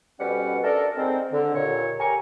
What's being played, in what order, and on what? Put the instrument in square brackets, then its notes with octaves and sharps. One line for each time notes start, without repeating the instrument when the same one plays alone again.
[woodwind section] F2 B2 G3 C#4 B4 F#5
D4 A4 A#4
G#2 C4
D3
D#2 A#2 C#5
G4 A#4 G#5 A#5 C#6